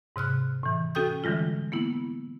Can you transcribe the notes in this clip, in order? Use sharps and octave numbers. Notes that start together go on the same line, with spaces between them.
G#2 C3 F6 F#6
A2 E3
C#4 F#4 A4 G5 D#6 G6
D3 E3 G3 G#3 F4
A#3 B3 E4